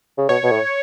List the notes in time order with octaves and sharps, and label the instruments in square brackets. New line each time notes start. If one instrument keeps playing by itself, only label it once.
[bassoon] C#3
[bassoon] B2 [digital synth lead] C#5
[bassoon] B2
A2